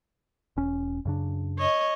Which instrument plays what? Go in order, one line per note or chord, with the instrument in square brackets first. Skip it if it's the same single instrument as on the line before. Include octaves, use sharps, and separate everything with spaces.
[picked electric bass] E1 C#4
F#2 C#3 D4
[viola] C#5 D#5